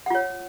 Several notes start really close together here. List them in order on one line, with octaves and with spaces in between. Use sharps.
F#5 F4 C#5